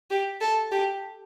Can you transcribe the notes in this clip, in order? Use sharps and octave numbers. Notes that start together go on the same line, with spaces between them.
G4
A4
G4